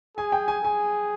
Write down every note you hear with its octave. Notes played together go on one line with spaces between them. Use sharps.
G#4 G#5
G5
G#5
G#4 G#5